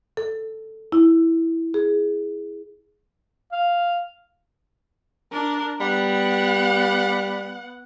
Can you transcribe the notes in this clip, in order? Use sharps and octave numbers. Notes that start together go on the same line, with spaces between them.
A4
E4
G#4
F5
D4 A#4
G3 B3 F#5